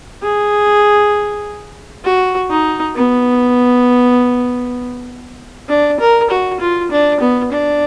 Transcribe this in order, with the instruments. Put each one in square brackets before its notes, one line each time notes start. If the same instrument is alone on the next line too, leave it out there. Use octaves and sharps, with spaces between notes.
[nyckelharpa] G#4
F#4
D#4
B3
D4
A#4
F#4
F4
D4
B3
D4